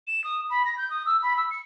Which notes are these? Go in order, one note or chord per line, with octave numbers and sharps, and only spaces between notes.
E7
D#6
B5
A#6
G6
D#6
E6
B5
E6
C#7